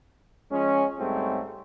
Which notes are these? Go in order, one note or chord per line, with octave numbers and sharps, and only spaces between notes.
F3 G#3 C#4
G#2 G3 A3 C4 C#4